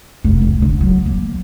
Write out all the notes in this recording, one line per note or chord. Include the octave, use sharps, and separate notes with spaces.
F1
C#2
D3
F#3
A#3